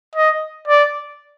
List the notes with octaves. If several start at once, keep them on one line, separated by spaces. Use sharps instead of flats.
D#5
D5